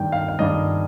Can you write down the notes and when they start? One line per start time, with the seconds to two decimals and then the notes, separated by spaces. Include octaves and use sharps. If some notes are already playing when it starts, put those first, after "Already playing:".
Already playing: G2 D#3 G5
0.12 F5
0.29 F5
0.39 G2 D#3 D#5